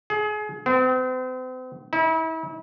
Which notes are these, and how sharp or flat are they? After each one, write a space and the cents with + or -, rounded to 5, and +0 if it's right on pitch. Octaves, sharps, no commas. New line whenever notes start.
G#4 +30
C4 -40
E4 -35